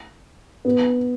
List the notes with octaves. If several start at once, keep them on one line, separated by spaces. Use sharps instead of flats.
B3